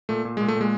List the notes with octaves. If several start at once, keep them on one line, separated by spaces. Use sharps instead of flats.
A#2 A3
A#2
G#3
A#2
A3
A#2 G#3